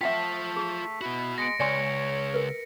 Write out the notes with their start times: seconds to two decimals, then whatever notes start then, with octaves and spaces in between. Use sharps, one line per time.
0.01 A3 F4 E5 F#5 G5 A5 B6
0.56 G#4
1.01 B3 E4 F#4
1.38 G#3 A#6 C#7 D7
1.60 C#2 C#5 D5 G#5 C6 C#7
2.34 A#4 B4